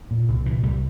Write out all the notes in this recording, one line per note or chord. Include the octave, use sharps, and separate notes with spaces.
A#2
C2
A#2 E3
C2 G3